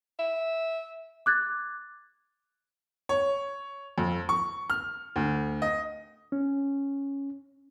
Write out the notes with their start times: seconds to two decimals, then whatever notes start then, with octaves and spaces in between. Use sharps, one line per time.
0.19 E5
1.26 D6 F#6 G#6 A6
3.09 C#5
3.98 F2
4.29 C#6
4.70 F6
5.16 D2
5.62 D#5
6.32 C#4